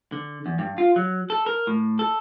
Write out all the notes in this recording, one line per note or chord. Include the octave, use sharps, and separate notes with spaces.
D3
E2
G2
F4
F#3
A4
A#4
A2
A4